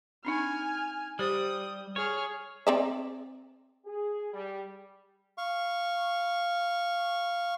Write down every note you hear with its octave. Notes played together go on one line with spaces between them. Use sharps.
C4 D4 D#4 G#5 F6
G3 G4 C5 D#6
G#4 C#5 F6
C4 D5 E5
G#4
G3
F5 C#6